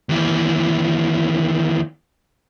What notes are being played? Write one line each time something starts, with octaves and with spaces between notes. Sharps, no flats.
D#2 E3